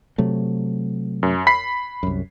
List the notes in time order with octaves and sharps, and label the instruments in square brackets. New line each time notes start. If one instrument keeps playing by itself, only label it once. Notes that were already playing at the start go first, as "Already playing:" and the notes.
[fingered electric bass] C3 F#3 A3
[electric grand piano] F#2
B5 B6 C7
[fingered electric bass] C2 F#2